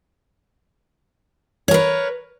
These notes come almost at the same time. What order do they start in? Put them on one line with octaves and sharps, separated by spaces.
C#5 A#4 B4